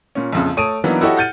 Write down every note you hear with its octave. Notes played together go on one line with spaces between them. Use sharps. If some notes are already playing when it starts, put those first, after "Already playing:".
A#2 C#4
A#1 F2 C#3
A3 C#5 A5 D#6 D7 D#7
E3 F#3 A#3 B3 D4 D#4
E4 F#4 G4 A4 C#5 D#5
F#5 F6 G6 A6 C#7 D#7